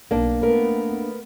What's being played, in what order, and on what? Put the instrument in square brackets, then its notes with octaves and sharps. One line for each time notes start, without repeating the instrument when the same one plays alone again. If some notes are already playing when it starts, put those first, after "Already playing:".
[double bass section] B1 [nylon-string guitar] A#3 D4
[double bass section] A3 B3 [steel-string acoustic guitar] A#4 B4